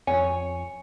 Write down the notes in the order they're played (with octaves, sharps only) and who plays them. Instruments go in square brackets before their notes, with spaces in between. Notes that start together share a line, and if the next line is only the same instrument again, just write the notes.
[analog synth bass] F2 [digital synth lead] C#5 [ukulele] G#5